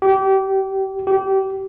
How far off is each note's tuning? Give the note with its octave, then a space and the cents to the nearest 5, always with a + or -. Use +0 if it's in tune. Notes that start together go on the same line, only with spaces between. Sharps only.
G4 -30
G4 -30